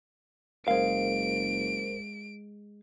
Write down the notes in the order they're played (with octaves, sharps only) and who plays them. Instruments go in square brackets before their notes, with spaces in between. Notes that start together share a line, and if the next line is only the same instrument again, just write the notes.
[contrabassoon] F#1 [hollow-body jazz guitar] G#3 F5 [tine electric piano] A#4 C5 [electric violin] D7